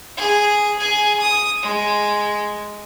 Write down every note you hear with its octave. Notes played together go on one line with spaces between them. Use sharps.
G#4
G#4 G#5
D#6
G#3